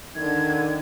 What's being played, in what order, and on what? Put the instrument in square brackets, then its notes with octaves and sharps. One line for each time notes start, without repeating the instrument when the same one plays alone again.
[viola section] D3 [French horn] D#3 [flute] G#6